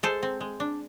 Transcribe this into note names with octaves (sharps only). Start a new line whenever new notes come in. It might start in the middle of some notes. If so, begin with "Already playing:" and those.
G#3 A4 C5
C4
G#3
D4